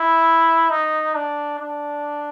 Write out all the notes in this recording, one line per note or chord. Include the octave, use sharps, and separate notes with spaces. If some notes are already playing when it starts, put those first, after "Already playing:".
Already playing: E4
D#4
D4
D4